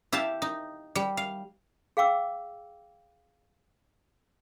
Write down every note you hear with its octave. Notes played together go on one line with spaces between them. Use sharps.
E4 G4 F5 A5
D#4
G3
F5
G#4 F5 G5 D6 E6